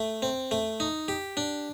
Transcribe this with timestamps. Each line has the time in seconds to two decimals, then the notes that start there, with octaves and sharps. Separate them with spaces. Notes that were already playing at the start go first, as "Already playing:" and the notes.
Already playing: A3
0.22 C4
0.51 A3
0.80 D#4
1.08 G4
1.37 D4